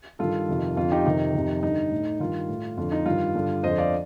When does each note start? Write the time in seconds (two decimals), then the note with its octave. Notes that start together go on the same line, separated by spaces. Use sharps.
0.19 G2 D#3 F4 A4
0.49 F2 C3 D#3
0.76 F2 D3 F4
0.92 D#4 G4
1.06 F2 C3 D#3 D#4
1.34 F2 C3 D#3
1.63 G2 D3 D#4
1.91 A2
2.20 G2 D#3 F4
2.48 A2
2.77 F2 D3 F4
2.92 D#4
3.06 G2 D#3 F4
3.35 G2 D3
3.63 F2 D3 C5 D#5
3.78 D5 F5